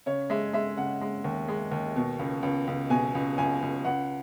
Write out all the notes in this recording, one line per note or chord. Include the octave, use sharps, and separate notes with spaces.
C#3 C#5
G#3 E5
G#3 E5
C#3 F#5
G#3
D#2
G#3
D#2
B2
C#2
C#2
C#2
B2 G#5
C#2
C#2 G#5
C#2
C#2 F#5